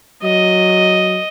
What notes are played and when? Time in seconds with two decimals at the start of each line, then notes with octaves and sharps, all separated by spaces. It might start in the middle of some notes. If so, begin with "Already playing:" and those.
0.23 F#3 D#5